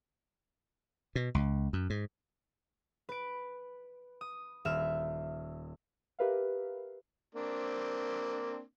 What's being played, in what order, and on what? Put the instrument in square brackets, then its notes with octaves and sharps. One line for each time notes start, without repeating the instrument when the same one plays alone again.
[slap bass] B2
C#2
F#2
G#2
[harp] B4 D7
D#6
D#1 E5 F6 E7
[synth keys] G4 A#4 B4 E5 F5
[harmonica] A#3 C4 D4